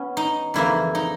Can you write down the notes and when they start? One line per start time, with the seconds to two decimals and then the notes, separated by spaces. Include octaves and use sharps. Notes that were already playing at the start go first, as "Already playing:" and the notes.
Already playing: B3 C#4
0.17 D#4
0.54 F2 C#3 E3 G3 A#3 E4
0.95 D#4